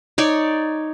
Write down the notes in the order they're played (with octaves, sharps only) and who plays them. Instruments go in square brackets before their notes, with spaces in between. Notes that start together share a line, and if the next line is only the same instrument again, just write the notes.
[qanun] D#4 C#5 D5